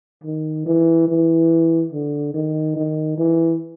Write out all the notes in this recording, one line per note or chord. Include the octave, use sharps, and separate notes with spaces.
D#3
E3
E3
D3
D#3
D#3
E3